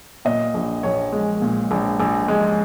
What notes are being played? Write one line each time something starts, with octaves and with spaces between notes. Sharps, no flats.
A#2 D#5
A#1
A#1 C#5
G#3
A#2
A#1
A#1
G#3